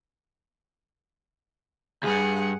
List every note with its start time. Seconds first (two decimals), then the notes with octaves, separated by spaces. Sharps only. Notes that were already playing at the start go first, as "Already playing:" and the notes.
2.03 D2 G2 G#4 F#5